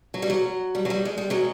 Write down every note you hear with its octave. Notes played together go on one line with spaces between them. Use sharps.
F#3
G3
F#3
G3
F#3
G3
G#3
G3
F#3 G#3